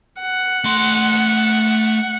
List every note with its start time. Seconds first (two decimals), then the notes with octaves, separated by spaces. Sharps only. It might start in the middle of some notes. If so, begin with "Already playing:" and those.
0.21 F#5
0.64 A3 C6